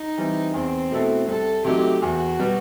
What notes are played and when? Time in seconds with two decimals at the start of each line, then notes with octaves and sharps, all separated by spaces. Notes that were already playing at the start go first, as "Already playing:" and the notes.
Already playing: D#4
0.18 E3 G3 C4
0.54 E2 C4
0.91 B2 A3 E4 A4
1.28 C2 A4
1.65 C3 F#3 A3 D#4 G4
2.02 E2 F#4
2.39 B2 G3 B3